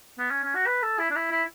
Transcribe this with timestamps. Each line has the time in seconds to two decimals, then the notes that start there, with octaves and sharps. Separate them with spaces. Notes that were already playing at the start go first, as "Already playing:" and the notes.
0.19 B3
0.30 C#4
0.43 C#4
0.55 F#4
0.66 B4
0.83 A4
0.99 E4
1.11 D4
1.16 E4
1.31 E4